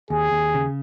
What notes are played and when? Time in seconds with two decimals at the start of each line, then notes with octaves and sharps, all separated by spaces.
0.10 D#2 G#4
0.32 D#2
0.55 C#3